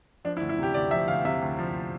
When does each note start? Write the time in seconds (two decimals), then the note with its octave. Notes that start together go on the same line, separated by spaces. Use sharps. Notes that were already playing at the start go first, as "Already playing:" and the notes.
0.25 F3 D4
0.37 E4
0.41 D2
0.49 E4
0.58 C3 G4
0.74 D2 D5
0.91 F3 E5
1.08 D2 F5
1.25 C3 E5
1.42 D2
1.59 F3